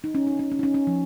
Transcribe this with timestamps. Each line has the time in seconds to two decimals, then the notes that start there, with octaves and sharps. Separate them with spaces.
0.04 D#4
0.15 C#4
0.27 D#4
0.39 C#4
0.52 C#4
0.59 D#4
0.63 C#4
0.74 C#4
0.87 F3